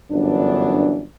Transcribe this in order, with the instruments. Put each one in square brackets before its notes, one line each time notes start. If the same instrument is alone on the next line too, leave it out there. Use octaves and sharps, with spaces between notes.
[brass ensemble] G1 F#2 E3 B3 D4